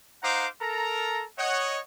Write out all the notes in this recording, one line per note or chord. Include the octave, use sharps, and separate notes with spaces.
D#4 C5 F5 F#5 A#5 D6
A4 A#4 A#5
C#5 D#5 F#5